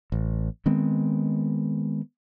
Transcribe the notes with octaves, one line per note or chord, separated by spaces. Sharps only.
A1
D#3 G#3 B3 C4